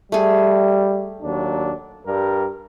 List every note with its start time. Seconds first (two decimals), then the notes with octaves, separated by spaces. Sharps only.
0.12 G3 A3 G#4
1.23 D#2 F#3 D4
2.07 G2 G3 A#4